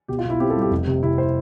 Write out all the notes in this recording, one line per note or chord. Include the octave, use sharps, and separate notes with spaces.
B2 G4
F4
B1
E4
C4 G4
A4
G3 G4
F1
C3
C3 E4
C5